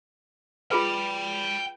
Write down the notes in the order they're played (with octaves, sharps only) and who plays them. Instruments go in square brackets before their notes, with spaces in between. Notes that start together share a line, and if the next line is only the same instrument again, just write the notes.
[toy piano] F4 G#4 B4 [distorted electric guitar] G5 B5